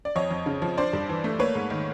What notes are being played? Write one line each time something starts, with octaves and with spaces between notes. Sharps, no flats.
D5
F2 C#5 D#5
F2
C#3
F3
D4 C5 D5
G2
E3
A3
A#3 B4 C#5
G#2
D#3